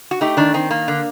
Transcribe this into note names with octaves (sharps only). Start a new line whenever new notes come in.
F#4
A3 D#4 G4
D#3 D4
D#3 C4
A#3
D3